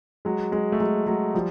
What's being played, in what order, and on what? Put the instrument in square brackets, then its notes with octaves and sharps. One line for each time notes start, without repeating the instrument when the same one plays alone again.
[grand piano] F#3 G#3
F#3 G#3
A3
F#3 G#3
F#3 G#3
F3 G3